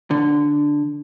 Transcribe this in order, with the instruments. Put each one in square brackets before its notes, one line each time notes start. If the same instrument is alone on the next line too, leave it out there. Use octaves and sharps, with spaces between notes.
[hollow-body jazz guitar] D3